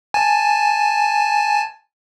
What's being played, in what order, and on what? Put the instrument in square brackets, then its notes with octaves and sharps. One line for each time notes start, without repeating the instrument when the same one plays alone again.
[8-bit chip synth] G#5 A5